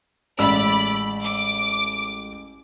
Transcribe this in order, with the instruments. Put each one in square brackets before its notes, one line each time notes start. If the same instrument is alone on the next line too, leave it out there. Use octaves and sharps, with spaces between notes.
[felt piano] A1 G#3 E6 [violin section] D5 B5
[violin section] D6